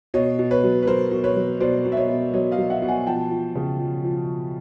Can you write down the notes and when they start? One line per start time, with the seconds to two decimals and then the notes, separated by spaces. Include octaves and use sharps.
0.14 B2 C#5 D#5
0.39 B2
0.51 B4 C#5
0.63 F#3
0.83 B4
0.87 F#3 A#4 C5
1.11 B2
1.24 B4 C#5
1.36 F#3
1.60 B2 C5 D5
1.85 B2
1.92 E5
1.97 C#5 D#5
2.09 B2
2.34 F#3 C#5 D#5
2.51 D#5 F5
2.58 F#3
2.70 E5 F#5
2.82 B2
2.88 F#5 G#5
3.07 F3 G5 A5
3.31 F3
3.55 C#3
3.80 F3
4.04 F3